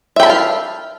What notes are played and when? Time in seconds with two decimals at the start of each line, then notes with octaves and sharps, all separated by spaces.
0.16 E5
0.20 G5
0.23 B5
0.26 A5
0.29 F5